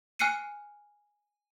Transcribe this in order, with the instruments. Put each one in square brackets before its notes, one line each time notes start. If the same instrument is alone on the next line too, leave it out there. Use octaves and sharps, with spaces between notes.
[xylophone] G#5 F6 F#6 C7 C#7 D#7